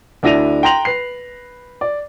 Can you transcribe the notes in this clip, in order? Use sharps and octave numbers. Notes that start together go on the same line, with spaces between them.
D2 D4 E4 A#6 D#7 F7
G5 A#5 C6 A#6 F7 F#7
B4 C7
D5